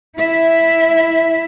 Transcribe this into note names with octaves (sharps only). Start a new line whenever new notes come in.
E4 E5